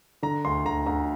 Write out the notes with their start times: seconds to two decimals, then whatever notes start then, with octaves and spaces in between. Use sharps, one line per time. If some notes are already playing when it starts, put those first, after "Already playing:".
0.23 D3 A#5
0.45 D2 C6
0.65 D2 A#5
0.86 D2 A#5